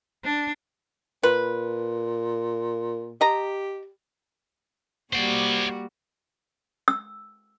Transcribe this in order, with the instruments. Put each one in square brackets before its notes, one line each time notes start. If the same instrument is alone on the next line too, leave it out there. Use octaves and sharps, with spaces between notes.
[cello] D4
[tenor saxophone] A#2 [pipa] B4
[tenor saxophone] G4 [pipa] D#5 A#5
[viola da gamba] G3 A#3 F#4 [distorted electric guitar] C5 D5
[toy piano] E6